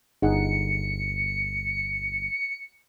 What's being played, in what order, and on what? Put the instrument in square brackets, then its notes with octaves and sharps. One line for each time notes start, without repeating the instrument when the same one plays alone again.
[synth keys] G1 [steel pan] D#4 G#4 F#5 [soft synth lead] C#7